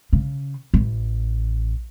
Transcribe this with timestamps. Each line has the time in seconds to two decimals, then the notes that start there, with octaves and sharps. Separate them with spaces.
0.13 C#3
0.74 A1